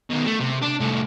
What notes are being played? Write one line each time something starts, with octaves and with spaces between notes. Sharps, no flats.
B2 D#3
A3
C3
D4
C2 A3